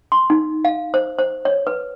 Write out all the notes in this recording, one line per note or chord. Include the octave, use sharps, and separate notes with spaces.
C6
D#4
F5
C5
C5
C#5
B4